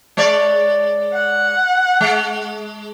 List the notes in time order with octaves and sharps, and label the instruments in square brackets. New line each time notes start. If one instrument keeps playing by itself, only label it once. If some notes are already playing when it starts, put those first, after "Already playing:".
[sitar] G#3 C#5 D5
[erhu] F#5
[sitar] G#3